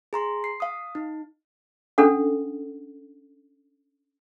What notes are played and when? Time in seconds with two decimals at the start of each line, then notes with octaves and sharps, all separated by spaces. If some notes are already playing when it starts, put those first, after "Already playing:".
0.13 G#4 A#5 C6
0.44 C7
0.60 F5 D#6
0.95 D#4
1.98 C#4 D4 A4 F#5